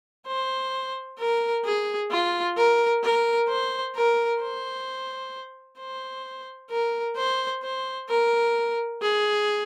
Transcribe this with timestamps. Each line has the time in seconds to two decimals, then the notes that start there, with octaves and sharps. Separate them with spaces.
0.27 C5
1.19 A#4
1.65 G#4
2.11 F4
2.56 A#4
3.03 A#4
3.49 C5
3.95 A#4
4.41 C5
5.79 C5
6.71 A#4
7.17 C5
7.63 C5
8.09 A#4
9.01 G#4